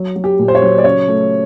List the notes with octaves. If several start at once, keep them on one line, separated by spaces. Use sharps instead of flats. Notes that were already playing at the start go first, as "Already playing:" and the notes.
Already playing: F#3
F#3
G4
A#2
C5
C#5
F#3
D5
C#3 C#5
A3